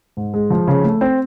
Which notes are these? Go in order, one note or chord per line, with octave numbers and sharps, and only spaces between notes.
G#2
G#3
F3
C#3
A3
C4